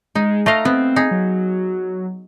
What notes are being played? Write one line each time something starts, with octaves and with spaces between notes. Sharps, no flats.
G#3 D#4
A3 D#5 F5 A#5
B3 C4
D#4 G#4
F#3